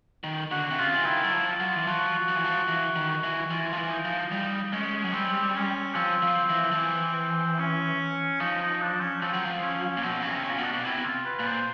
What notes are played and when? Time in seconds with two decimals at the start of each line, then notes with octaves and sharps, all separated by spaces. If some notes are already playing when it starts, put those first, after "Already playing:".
0.24 D#3
0.51 D3 F#4
0.71 C3
0.78 C#3 F4
0.94 E3
1.05 D#3 E4
1.24 F#3
1.33 F3
1.47 F4
1.60 F#3
1.76 E3
1.87 F3 F#4
2.28 F3
2.36 E3
2.45 F3
2.68 E3
2.96 D#3
3.23 E3
3.50 E3 F4
3.73 F3
3.78 E3
3.91 D#4
4.05 F3
4.32 G3 D#4
4.73 G#3 C#4
5.04 F#3
5.13 G3 C4
5.54 C#4
5.95 F3 C4
6.22 F3
6.50 E3
6.72 F3
6.77 E3
7.59 C#4
8.40 F3 D#4
8.61 D#4
8.81 D4
9.01 C#4
9.21 F3 C4
9.33 F#3
9.45 F3
9.62 C#4
9.97 A#2
10.03 B2 C4
10.22 C#3 C#4
10.31 C3
10.44 C#4
10.50 A#2
10.58 B2
10.64 D4
10.73 B2
10.85 C3 E4
11.05 F4
11.25 B4
11.39 A#2
11.46 C5